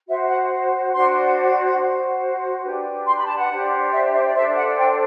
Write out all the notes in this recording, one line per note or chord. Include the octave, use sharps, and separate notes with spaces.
F#4 C5 E5
F#5
D4 F#4 C5 C6
F#4 C5
D4 G4 B4
C6
B5
A5
F#5
D4 G4 C5
E5
E5
D5
D4 A4 C5 E5
F#5
G5